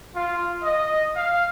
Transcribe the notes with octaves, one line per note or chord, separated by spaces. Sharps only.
F4
D#5
F5